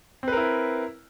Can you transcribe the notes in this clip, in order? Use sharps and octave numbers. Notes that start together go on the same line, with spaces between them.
C4 E4 A#4 B4